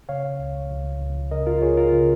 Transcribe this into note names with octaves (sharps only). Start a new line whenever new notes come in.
C#3 C#5 F5
C#2
C#2
C#2
C#3 A#4 D#5
F4 A#4
C#2 G#4 C#5
F4 A#4
C#3